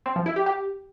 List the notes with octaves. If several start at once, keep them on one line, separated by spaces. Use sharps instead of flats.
C4
F3
E4
G4
G4